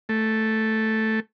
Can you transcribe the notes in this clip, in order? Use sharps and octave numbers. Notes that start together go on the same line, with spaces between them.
A3